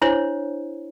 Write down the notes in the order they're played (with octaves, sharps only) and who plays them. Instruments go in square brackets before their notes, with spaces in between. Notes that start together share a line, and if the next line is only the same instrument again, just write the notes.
[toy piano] D4 E4 C5 C#5